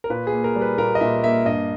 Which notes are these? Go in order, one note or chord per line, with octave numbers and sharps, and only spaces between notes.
A#4
A#2 B4
G#4
A#3
A#4
G3
B4
A#2 A#4
D#5
A#2 E5
A#3 E5
G2 D#5